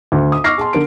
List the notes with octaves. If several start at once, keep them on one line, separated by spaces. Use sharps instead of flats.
D2
D#6
C#6 D6 E6 F6 A#6 C7
G#4 A5 C6
D3 A#4 D7